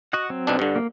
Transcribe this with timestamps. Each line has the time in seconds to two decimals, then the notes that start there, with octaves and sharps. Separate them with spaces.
0.13 F#4 D#5 F#5
0.30 F#3 C4
0.47 B1 B2 D4
0.59 G2 D3
0.76 A#3